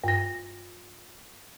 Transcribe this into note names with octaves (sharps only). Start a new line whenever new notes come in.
G2 A#6